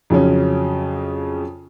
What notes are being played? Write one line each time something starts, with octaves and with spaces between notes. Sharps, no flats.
F2 C#3 F#3 C#4